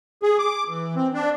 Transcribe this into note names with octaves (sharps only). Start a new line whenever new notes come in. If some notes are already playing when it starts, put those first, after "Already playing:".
G#4
D6
E3
C4
D4